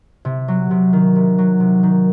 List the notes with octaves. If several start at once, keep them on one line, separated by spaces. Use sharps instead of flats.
C3
F#3
C3
D#3
C3
F#3
C3
D#3